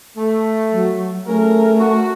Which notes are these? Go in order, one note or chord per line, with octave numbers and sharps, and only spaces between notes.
A3
F#3
A3 C#4 G#4 A#4
F#4